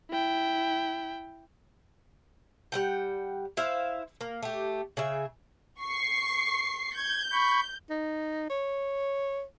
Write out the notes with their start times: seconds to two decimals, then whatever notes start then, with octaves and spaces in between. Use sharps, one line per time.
0.11 E4 G5
2.72 G3 F#5 G5
3.57 E4 C5 E5 F5
4.21 A#3
4.43 A3 G4
4.97 C#3 G#4 E5
5.81 C#6 C7
6.96 G6 G#6
7.32 B5 C#6
7.90 D#4
8.50 C#5